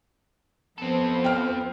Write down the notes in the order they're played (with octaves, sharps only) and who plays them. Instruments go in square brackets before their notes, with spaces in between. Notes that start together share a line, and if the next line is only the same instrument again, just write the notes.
[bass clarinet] F3 [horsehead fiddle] B3 C5 [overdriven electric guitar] C4 A4
[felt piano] G5 F6